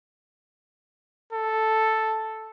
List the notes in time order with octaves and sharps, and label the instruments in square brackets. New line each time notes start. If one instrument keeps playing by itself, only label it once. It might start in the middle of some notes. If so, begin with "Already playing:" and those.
[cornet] A4